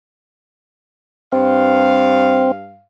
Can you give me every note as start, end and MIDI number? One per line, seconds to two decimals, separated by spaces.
1.32 2.83 43
1.32 2.51 60
1.32 2.83 77